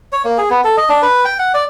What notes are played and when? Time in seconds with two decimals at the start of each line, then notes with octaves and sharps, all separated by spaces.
0.12 C#5
0.25 A#3
0.38 G#4
0.50 B3
0.64 A4
0.77 D#5
0.89 D4
1.02 B4
1.25 G5
1.39 F#5
1.54 D5